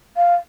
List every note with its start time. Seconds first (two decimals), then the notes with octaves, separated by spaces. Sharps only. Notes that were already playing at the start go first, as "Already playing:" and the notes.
0.17 F5